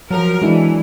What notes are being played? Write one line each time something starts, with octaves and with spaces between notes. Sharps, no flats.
F3 F#3 A#4
E3 G#3 D4 E4